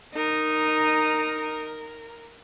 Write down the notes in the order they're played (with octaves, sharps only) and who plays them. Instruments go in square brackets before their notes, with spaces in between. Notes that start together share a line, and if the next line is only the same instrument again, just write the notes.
[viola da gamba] D#4 [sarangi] A#4